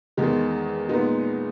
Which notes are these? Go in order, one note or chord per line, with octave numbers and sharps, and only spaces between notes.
E2 D#3 G#3
A#2 G#3 B3 D#4